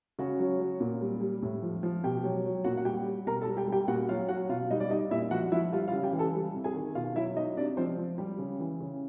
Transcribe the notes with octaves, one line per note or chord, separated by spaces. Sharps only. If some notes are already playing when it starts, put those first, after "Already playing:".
C#3 F#4 F#5
F#3
F#3
A#2
G3
G3
A2
F3
F3
B2 G4 G5
F#3
F#3
A#2 F#4 F#5
F#5
G3 G4 G5
G3
B2 A#4 A#5
A4 A5
G3
G4 G5
G3
G4 G5
A#2 F#4 F#5
F#3 F4 F5
F#3 F#4 F#5
B2 F4 F5
G3 D#4 D#5
D5
G3 D#4 D#5
A#2 E4 E5
F3 F#4 F#5
F3 E4 E5
G3 F4 F5
F4 F5
C#3
G4 G5
E3
A4 A5
G3
C3
G#4 G#5
D#3
B2 F4 F5
F#3 E4 E5
F#3 D#4 D#5
C3 D4 D5
F3 C4 C5
F3
G3 G4
C#3
E3
C#3